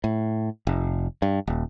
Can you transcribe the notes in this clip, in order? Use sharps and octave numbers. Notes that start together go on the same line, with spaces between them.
A2
F1
G2
D#1